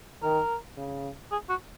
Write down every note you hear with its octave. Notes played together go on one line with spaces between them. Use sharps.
D#3 A#4
C#3
G#4
F#4